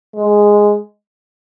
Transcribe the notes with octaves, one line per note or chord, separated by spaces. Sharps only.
G#3